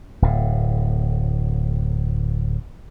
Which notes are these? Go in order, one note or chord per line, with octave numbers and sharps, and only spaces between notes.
D1 A2